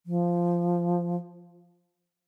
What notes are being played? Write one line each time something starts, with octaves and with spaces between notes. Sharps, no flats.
F3